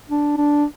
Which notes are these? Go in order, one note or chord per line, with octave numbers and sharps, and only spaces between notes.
D4
D4